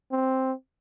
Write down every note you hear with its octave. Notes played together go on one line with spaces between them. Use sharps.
C4